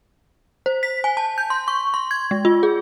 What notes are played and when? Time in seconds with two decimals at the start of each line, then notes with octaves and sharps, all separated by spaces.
0.66 C5
0.83 B6
1.04 G#5
1.17 A5
1.38 G6
1.50 C6
1.68 C#6
1.94 C6
2.11 G#6
2.31 G#3
2.45 F4
2.63 G#4